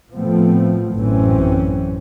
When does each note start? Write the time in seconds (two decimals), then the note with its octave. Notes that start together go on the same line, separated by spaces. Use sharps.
0.14 A2 F3 A3 B3 C4
0.95 A1 F#2 E3 C4 C#4